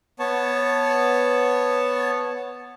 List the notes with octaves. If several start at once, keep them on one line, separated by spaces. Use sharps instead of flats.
B3 C#5 A5